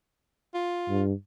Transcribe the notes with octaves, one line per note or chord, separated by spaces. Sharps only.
F4
G2